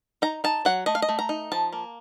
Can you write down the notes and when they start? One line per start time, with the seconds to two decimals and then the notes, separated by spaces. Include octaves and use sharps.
0.22 D#4 A#5
0.44 D#4 A5
0.65 F#3 F#5
0.86 A3 D#5
0.95 F5
1.02 D#5
1.09 A3
1.19 A#5
1.29 D#4
1.52 F3 A5
1.72 A#3